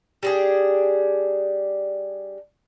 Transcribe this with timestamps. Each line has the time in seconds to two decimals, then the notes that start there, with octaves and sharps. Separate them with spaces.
0.23 G3 D4 G#4